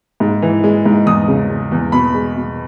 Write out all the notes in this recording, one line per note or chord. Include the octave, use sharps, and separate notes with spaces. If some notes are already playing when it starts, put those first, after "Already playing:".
G#2
E3
G#3
G#2
E2 D#6
C#3
G#3
E2
B2 B5
G#3
B2